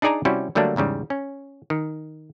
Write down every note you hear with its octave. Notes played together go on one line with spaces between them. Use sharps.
D4 D#4 G#4 D5 G#5 A#5
C3 G3 C#4 E4 F#4
D3 F#3 G3 A3 A#3 D4
E2 G#2 C#3 G3
C#4
D#3